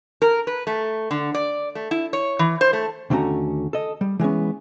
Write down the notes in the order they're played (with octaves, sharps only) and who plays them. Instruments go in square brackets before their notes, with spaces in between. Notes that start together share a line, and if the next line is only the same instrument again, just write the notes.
[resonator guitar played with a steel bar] A#4
B4
A3
D3
D5
A3
E4
C#5
E3
C5
A3
[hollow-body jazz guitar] D#2 D3 A3 C#4 F#4 A#5
A4 D#5
G3
E3 G#3 B3 C#4